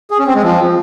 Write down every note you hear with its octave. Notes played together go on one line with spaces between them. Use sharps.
G#4
C#4
C4
G#3
F3